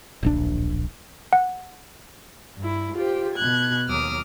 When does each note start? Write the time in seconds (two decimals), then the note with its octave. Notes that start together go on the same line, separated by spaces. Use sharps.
0.23 D1 A#1 D4
1.33 F#5
2.57 G2 E4
2.94 F4 G4 C5
3.35 B2 F#6 G#6
3.89 D#2 F#3 D6 D#6 F6